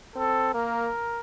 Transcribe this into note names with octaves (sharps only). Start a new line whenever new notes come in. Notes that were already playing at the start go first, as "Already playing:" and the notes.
C4 A4
A#3 A#4